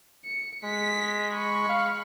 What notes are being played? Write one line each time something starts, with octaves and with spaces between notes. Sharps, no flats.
C#7
G#3 B6
B5 C#6
F5